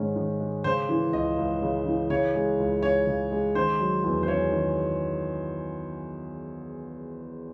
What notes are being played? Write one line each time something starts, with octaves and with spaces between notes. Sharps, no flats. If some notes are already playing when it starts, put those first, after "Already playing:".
Already playing: G#2 D#3 G#3 C#4
D#3
G#3
C#3 C5
E3
C#2 D#5
C#2
C#3
E3
C#3 C#5
G#3
C#2
C#4 C#5
C#3
G#3
D#3 C5
F#3
E2
C5
C#4 C#5
D#3